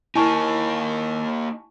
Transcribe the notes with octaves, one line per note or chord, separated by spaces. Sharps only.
A#3 D#4 E4 G#5 A5 C#6